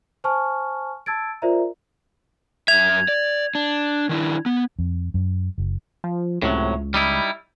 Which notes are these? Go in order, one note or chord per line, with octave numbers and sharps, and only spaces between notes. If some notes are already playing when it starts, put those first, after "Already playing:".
C5 G#5 A5 C#6 F6
A5 E6 G#6 A6 D7
F4 A#4 C5 D5 E5 A#5
F#2 E5 G#6 F7
D5
D4
D#3 D4 E4
B3
F2
F#2
F#1
F3
C#2 A2 C3 F#3
G3 D#4 E4